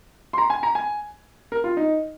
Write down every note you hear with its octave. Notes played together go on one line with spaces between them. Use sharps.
C6
A#5
G#5
A#5
G#5
A#4
F4
D#4